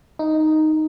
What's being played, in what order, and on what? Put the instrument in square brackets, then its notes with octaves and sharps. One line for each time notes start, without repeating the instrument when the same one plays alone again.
[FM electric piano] D#4